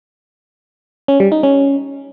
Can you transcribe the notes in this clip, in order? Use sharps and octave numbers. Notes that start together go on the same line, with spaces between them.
C#4
G3
D#4
C#4